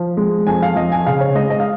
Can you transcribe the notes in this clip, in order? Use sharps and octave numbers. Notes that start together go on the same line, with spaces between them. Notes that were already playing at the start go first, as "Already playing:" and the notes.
Already playing: F3
G#3
F2 G#5
F5
F2 D#5
G#5
C#3 F5
C#5
G#3 D#5
D#5
F5